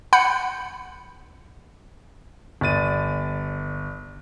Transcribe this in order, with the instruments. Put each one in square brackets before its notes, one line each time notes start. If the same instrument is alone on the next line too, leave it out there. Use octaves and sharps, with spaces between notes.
[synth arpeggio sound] F#5 B5 F#6 G6 C#7
[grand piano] G1 D5 A6 D#7